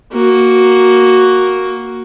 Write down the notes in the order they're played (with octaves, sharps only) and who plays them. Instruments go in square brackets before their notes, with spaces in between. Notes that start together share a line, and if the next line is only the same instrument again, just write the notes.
[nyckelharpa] A#3 F#4